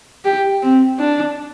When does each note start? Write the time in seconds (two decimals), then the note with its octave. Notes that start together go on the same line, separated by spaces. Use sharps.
0.25 G4
0.62 C4
0.99 D4